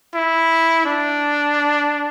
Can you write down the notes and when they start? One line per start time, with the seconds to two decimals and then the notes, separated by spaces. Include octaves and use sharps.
0.15 E4
0.85 D4